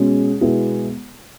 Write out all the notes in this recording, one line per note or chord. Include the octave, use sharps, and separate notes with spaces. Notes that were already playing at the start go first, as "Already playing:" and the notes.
Already playing: B2 G#3 C#4 G#4
B2 G#3 B3 E4